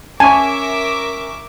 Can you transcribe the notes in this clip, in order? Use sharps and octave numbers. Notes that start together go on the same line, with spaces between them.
C#4 A#4 E5 G#5 A5 C#6 D6